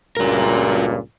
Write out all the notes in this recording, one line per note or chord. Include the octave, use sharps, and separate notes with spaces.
C#2 G2 A#2 F#4 A#4